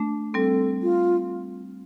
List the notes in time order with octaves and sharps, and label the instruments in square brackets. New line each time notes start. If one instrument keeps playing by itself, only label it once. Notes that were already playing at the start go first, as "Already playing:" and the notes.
Already playing: [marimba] A3 D4
[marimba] G3 C4 [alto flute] A4
[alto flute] F4